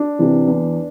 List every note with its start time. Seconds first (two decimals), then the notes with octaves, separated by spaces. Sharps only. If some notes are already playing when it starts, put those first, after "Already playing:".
Already playing: D4
0.19 C3 E3
0.48 E2